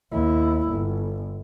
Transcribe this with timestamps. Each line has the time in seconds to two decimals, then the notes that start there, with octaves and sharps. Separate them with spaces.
0.12 D#2 E4
0.70 G1